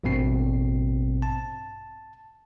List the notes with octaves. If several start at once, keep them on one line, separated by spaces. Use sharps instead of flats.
A1 G2 B2 C4 C7
A5